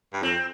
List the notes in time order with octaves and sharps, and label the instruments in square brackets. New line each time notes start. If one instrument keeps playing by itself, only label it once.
[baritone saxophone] G2
[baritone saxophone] F2 [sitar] C4